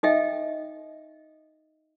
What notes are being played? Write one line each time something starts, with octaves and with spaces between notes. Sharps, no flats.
D#4 A4 D#5 E5 G5